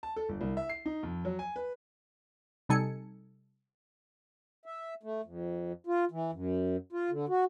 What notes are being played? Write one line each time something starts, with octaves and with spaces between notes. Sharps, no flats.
A5
A4
G1
C2
E5
C7
D#4
F2
F#3
G#5
B4
C3 G3 D#4 A4 G#5 C#7
E5
A3
F2
F4
E3
F#2
F4
D3
F#4